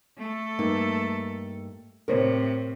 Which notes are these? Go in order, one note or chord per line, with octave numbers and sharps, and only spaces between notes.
A3 A4
G2 A#3 D#4
A2 C3 A#4 C5 C#5